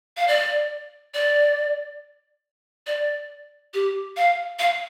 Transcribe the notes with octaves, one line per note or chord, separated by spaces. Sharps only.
F5
D5
D5
D5
G4
F5
F5